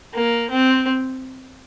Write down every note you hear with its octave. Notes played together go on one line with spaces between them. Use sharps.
A#3
C4